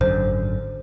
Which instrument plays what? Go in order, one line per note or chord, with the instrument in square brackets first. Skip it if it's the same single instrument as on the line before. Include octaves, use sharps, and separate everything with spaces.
[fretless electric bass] G#1 F#2 D3 [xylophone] C5